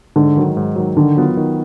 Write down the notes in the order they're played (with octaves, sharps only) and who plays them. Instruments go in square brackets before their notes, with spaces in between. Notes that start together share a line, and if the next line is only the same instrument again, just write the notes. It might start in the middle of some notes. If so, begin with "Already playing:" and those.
[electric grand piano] G#2 [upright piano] D3
[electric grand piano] D#3 F#3
G#2
D#3 F#3
[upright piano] D3 [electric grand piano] D#3
[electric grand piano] F#3 B3 F4
D#3